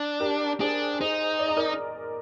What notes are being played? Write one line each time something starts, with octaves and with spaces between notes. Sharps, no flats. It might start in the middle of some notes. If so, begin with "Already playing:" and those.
Already playing: D4
G4 A#4
D4 G#4 C5
D#4 G#4 C5
D5
D#5
A#4 D5